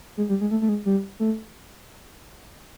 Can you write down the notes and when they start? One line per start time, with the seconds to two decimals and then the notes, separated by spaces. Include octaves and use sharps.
0.17 G#3
0.29 G3
0.41 G#3
0.51 A3
0.61 A3
0.69 G#3
0.85 G3
1.20 A3